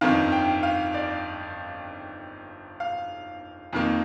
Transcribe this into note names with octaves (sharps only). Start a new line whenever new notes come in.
G1 F2 D#3 F5
G5
F5
D5
F5
F2 D#3 A#3